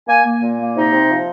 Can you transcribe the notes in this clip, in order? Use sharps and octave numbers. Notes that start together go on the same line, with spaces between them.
A#3 G#5
A#3
A#2
A#3
C3 D#4
C3
F3